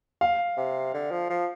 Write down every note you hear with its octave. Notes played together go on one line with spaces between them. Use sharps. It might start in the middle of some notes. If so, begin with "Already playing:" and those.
F5
C3
D3
F3
F3